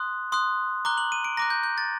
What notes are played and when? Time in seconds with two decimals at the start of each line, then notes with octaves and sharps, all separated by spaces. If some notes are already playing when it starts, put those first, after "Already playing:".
Already playing: C6 D#6 F#6
0.32 C6 D#6 F#6
0.85 A#5 D6 F#6 G7
0.98 F#7
1.12 D#7
1.24 D7
1.37 A#5 D6 F#6 A#6
1.50 G6
1.63 G6
1.78 A6